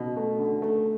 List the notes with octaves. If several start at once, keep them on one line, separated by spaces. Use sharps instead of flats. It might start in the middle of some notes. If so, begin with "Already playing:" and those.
Already playing: B2
A3
D3
A3